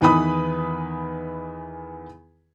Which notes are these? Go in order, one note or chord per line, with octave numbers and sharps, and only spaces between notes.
E2 D#3 E3 B4 B5 D#6